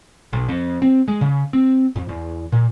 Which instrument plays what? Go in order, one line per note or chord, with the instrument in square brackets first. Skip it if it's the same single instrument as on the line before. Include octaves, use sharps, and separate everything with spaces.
[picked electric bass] B1
F2
C4
G#3
C#3
C4
F2
E2
A#2